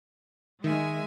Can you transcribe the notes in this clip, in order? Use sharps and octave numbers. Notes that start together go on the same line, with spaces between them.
D#3 G#3 E5 G#5